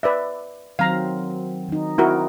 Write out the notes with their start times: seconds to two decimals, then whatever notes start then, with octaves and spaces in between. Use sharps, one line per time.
0.03 B4 D5 E5
0.79 D#3 F#3 C4 F5 A#5
1.69 D#3 D#4
1.98 C4 E4 F#4 A#4